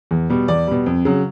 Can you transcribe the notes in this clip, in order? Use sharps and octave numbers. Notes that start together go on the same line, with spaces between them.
E2
B2 G3
E2 D5
B2 G3
F2
C#3 F#3